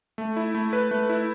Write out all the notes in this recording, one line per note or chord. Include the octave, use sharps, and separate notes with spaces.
A3
E4
A3
B4
A3
E4